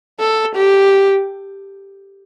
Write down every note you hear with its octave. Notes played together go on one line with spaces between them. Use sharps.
A4
G4